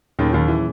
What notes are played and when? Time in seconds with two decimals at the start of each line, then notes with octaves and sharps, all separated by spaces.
0.19 D#2 A#2 D#3 F#3 C#4 G#4
0.33 D#2 D#3
0.48 E3